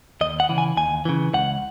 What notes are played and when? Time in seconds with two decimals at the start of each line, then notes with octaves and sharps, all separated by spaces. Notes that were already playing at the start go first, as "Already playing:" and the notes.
0.21 D#2 D#5
0.40 F#5
0.49 C#3 E3
0.58 G#5
0.77 D#2 G#5
1.05 C#3 E3
1.34 C#2 F#5